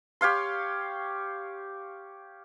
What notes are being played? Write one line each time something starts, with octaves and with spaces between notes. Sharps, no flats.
G4 C#5 F5 C6